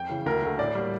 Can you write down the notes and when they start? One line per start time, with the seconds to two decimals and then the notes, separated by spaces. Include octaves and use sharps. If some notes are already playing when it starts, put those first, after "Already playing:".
Already playing: F2 G5
0.09 C#3 E3
0.26 D2 A#4
0.42 D3 A3
0.59 A2 D5
0.75 G3 A#3